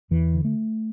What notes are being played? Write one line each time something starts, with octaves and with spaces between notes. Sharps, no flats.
E2 E3
D3
A3